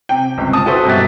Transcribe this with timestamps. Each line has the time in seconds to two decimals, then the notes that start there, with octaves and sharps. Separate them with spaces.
0.09 C3 G5
0.37 G1 C#2 C3
0.53 A5 D#6
0.66 E4 F#4 A4 B4 C5
0.85 G2 B2 F#3 G4 E5 A6